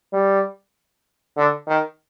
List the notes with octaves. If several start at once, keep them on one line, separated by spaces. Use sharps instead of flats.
G3
D3
D#3